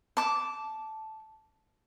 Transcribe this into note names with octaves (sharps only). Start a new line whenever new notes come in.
A5 D6